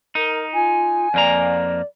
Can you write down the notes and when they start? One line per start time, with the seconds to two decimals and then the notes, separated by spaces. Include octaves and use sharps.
0.15 D#4 A#4
0.53 F4 G#5
1.14 F2 A#3 D5 A#5